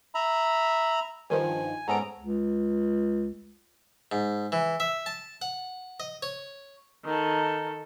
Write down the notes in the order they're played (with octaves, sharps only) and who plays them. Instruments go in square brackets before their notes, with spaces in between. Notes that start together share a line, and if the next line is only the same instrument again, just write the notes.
[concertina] E5 A#5 B5
[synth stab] G2 D#3 F3 [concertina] G#5
[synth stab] G#2 C#4 D7 [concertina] B3 A4 A#5
[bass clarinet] C#2
[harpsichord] G#2
E3
E5
A5
F#5
D#5
C#5
[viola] D#3 A4